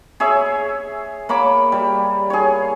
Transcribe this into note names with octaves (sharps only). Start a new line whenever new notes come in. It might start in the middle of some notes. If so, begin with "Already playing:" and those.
G#4 C#5 E5
A#3 C#5 B5 D6
G3
G#4 C#5